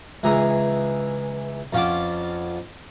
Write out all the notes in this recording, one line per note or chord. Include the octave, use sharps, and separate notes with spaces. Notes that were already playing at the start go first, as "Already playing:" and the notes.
C#2 E3 G#4 A#5 D#6
F2 C#4 F4 F#5 A5 D6